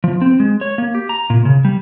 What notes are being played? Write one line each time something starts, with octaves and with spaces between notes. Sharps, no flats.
F3
C4
G#3
C#5
A#3
G4
A#5
A#2
C#3
G3